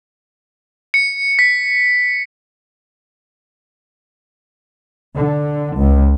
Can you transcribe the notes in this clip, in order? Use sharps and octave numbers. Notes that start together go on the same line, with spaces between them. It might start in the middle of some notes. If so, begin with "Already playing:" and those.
C#7
B6
D3
C#2